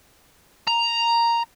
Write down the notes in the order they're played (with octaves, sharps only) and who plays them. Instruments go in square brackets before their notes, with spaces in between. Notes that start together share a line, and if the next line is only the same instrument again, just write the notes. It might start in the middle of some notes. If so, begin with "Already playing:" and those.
[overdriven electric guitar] A#5